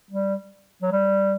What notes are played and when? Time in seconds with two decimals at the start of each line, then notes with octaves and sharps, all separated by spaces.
0.10 G3
0.82 F#3
0.92 G3